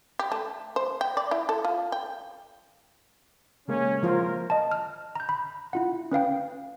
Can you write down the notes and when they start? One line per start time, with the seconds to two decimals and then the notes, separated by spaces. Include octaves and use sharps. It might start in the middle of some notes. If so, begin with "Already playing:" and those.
0.19 G4
0.32 A3
0.76 C5
1.01 G5
1.17 D5
1.31 E4
1.49 A4
1.65 F4
1.92 G5
3.68 C#3 G#3 A#3 C#4
4.03 F3 F4 A#4 C5
4.50 D#5 A5
4.71 F6
5.16 A#5 G6
5.29 B5
5.73 E4 F4 F#5
6.12 C#4 B4 F5 G5